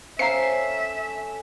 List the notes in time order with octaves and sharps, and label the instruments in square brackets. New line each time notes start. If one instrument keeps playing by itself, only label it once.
[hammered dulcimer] C#4 A4 [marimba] C5 F5 A#5 [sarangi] E5 [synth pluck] C7